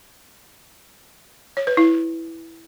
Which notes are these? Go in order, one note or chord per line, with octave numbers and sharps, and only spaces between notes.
C#5
B4
E4